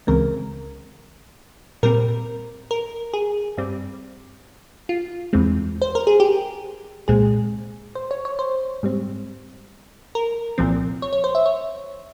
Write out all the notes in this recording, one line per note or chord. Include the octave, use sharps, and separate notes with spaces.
C#2 C#3 E3 G#3 C4 A#4
A#2 G3 C4 A#4
A#4
G#4
G2 G3 C4
F4
E2 E3 G#3 C4
C5
A#4
G#4
G4
C2 A#2 G#3 C4 G#4
C5
C#5
C#5
C5
G#2 G3 C4
A#4
C2 A#2 F3 C4
C#5
C#5
C5
E5
C#5